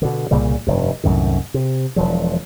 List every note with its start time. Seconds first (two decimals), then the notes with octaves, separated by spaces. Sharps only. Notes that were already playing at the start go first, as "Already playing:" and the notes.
0.02 B2 D3
0.31 C2 A#2 C#3 G3
0.67 F1 G2
1.04 C2 F#2 A2 D#3
1.54 C3
1.96 E1 F3 F#3